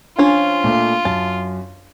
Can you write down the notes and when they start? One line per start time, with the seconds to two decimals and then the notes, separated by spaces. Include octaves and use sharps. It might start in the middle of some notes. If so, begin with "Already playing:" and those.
0.19 F3 C#4 D4 F4
0.64 A#2 A3
1.05 F#2 A5